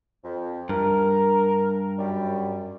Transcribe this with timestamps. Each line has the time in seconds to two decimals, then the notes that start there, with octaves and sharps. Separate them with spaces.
0.23 F2
0.69 G2 A#4
1.98 F#2 G3